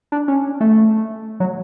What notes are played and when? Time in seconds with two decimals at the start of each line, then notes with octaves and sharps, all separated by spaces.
0.12 D4
0.28 C#4
0.61 A3
1.40 F#3